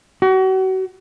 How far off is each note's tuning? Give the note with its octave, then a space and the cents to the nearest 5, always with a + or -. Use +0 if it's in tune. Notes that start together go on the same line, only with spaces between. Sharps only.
F#4 +35